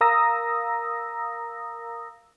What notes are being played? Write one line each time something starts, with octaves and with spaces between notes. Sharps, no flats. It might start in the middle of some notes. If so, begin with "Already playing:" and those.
A#4 F5 A#5 D#6 E6 A#6